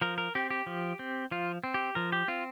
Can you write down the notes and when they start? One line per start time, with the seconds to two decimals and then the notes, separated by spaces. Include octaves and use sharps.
0.01 F3 A#4
0.18 A#4
0.35 C4 G4
0.51 G4
0.66 F3
0.99 C4
1.31 F3 F4
1.64 C4
1.74 G4
1.95 F3 A#4
2.12 G4
2.28 C4 F4